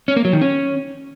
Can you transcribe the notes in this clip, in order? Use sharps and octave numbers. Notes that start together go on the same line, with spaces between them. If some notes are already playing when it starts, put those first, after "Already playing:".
C#4
A#3
F#3
D#3
C#4